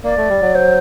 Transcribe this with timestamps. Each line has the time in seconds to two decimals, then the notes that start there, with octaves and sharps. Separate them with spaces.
0.04 A#3 D5
0.18 A3
0.29 G3
0.42 F#3
0.54 C5